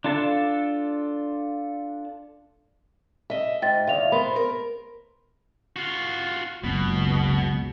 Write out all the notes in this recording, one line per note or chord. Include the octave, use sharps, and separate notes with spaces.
D4 F4 A4 A5
D#5 E5
G#2 G5 A6
E2 D#3 E5 F5 F7
B3 A#4 C5 B5 C6
A#4
F4 F#4
F#1 C#2 B2